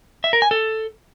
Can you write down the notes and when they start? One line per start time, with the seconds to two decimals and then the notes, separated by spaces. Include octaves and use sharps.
0.24 E5
0.33 A#4
0.42 G#5
0.51 A4